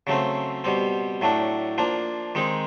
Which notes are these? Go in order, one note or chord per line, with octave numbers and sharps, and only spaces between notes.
C#3 F#3 A3 C4
B2 G3 C4
A2 F#3 A3 D4
F3 A#3 D4
D#3 G#3 C4 D#4